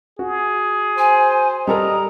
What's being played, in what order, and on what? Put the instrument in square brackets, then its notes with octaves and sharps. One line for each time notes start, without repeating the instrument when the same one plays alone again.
[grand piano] F#4 [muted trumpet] G#4
[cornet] C5 [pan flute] G#5
[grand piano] G3 A4 A#4 [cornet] D#5 [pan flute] A#5